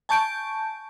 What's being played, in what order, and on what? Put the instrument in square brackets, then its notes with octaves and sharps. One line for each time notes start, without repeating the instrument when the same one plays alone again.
[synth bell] G#5 A5 C#6 G6 D7